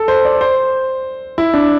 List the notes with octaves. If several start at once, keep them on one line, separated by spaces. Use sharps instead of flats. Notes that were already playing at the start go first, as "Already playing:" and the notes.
Already playing: A4
C5
D5
C5
E4
D4